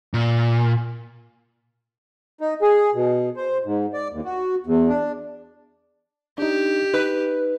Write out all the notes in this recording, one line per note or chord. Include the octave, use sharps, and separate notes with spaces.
A#2
D#4
G#4
B2
C5
G#2
D5
D#2
F#4
E2
D4
D4 D#4 G4
D#4 B4